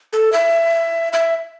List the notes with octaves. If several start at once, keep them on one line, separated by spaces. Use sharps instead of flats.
A4
E5
E5